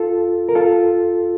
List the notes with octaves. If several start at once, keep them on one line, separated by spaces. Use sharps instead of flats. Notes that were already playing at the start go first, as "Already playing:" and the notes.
Already playing: F4 A4
A#4
F4 A4